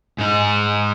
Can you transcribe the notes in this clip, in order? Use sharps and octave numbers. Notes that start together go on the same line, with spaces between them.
G#2 D#4